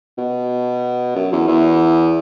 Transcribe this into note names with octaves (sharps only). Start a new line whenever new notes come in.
B2
F#2
E2
E2